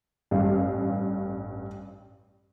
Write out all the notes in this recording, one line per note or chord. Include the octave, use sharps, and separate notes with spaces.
A1 G2 G3 F5